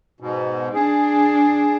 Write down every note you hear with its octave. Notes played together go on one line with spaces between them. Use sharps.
G#2 B2
D4 G#4